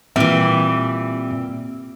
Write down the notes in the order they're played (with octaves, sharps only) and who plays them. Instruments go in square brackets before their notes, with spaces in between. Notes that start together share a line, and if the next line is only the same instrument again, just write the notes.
[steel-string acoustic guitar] A#2 [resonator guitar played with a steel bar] E3 G3 [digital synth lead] C4 [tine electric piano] E5